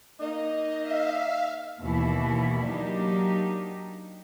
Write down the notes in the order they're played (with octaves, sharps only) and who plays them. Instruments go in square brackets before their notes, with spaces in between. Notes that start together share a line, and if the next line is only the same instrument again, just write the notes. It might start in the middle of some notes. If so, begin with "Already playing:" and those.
[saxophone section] A#3 D#4 [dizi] D#5
[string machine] E5 F5
[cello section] D#2 B2 E3 E4
F#3 A#3 D4 D#4 G4